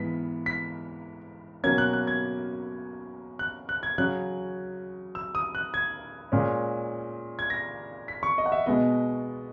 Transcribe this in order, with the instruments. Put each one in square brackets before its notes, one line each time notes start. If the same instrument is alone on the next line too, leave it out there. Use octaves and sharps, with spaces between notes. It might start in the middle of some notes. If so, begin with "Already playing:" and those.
Already playing: [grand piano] G#2 E3 B3 B6
B6
B2 F#3 A#3 C#4 G#6
F#6
F#6
G#6
F#6
F#6
G#6
C#3 F#3 C#4 F#6
E6
D#6
F#6
G#6
A#2 G#3 C#4
G#6
A#6
B6
C#6
D#5
F#5
E5
B2 G#3 B3 D#5